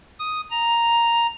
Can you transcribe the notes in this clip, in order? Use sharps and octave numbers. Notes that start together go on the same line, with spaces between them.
D#6
A#5